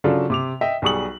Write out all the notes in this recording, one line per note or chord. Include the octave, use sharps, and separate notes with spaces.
C#3 F#3 D4 F4 A4
C3 D6 F7
D#5 E5 G5
B1 G3 G#4 C#6 D#6 F#7